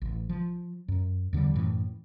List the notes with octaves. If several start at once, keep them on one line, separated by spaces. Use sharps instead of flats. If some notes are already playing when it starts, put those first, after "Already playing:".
A1
F3
F#2
E2 D3 D#3 G3
F#2 A2 E3